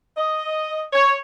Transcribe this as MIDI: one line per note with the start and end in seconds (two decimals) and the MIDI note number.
0.17 0.83 75
0.93 1.15 73